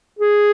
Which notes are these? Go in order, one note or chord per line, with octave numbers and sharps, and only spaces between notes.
G#4